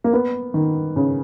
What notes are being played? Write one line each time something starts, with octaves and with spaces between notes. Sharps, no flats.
A#3
B3
D#3
C#3